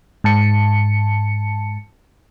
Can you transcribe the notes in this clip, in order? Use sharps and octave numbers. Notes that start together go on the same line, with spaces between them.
G#2 A5 C#7